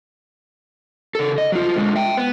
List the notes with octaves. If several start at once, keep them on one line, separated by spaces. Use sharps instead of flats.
C#3 A4
D#5
F#3 F4
D3 G#3
E5 G5
B3